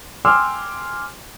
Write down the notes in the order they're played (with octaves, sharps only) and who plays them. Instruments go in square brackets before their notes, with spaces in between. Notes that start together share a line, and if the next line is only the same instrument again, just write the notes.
[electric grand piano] G5 G#5 C6 D6 E6 F6